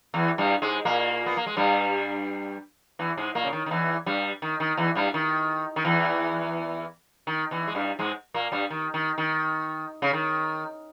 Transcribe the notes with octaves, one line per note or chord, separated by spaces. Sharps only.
E2 E3
G2 G3
G#2 G#3
A#2 A#3
B3
A#3
G#3
G2 G3
E2 E3
G#2 G#3
A#2 A#3
C#3
D#3
D#3
E2 E3
G2 G3
D#3
D#3
E2 E3
G2 G3
D#3
D#3
E2 E3
D#3
E2 E3
G#3
G2 G3
G#2 G#3
A#2 A#3
G2 G3
D#3
D#3
D#3
C#3
D#3